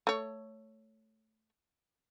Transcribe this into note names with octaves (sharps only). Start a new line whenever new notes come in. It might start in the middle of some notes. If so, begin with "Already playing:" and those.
A3 C#5